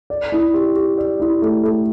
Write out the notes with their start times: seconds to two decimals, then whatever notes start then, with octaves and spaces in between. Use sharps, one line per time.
0.10 D5
0.32 E4
0.54 G4
0.76 G4
0.98 D5
1.20 E4
1.42 A3
1.64 A3